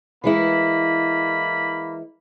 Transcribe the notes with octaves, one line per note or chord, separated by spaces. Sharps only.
E3 G#3 A#3 E4 B5